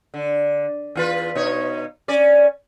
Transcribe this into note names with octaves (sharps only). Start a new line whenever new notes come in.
D3
E2 F4 B4
B2 D#4 C#5
C#4 D5